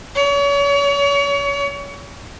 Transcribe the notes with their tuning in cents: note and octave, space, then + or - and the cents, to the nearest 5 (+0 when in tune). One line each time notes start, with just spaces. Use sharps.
C#5 +35